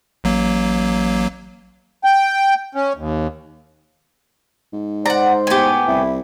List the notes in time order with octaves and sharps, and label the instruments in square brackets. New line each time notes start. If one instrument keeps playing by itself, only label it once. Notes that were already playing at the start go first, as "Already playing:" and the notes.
[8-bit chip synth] A1 F#3 A#3
[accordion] G5
C#4
D#2
[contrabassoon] G#2
[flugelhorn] C5 [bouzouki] D5 F#5 [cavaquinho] A#5
[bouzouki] A2 B3 [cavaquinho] G4 G#5
[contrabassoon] C2 [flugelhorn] E4